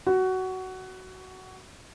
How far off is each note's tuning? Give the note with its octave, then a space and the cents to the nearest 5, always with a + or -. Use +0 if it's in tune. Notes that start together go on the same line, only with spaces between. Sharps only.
F#4 +15